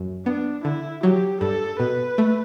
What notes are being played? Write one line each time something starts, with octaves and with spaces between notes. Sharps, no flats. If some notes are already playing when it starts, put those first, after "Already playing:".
Already playing: F#2
B3 D4
D3 E4
F#3 G4
G2 A4
B2 B4
A3